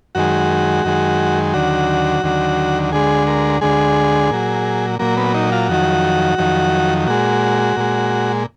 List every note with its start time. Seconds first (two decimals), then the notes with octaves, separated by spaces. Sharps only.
0.15 F#2 D#3 G#3 F#4
0.85 F#2 D#3 G#3
1.53 D#2 D3 F#3 F#4
2.23 D#2 D3 F#3
2.92 D2 D3 G#3 G#4
3.27 A#4
3.61 D2 D3 G#3 G#4
4.31 A#2 F#3
4.99 A#2 F#3 A#3
5.17 B3
5.34 D#4
5.52 F4
5.69 F2 D#3 F#3 F#4
6.38 F2 D#3 F#3
7.07 A#2 G#3 F#4
7.77 A#2 G#3